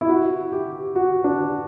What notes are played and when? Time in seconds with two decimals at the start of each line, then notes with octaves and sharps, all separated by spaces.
0.01 E4
0.09 F#4
0.52 G4
0.95 F#4
1.24 D4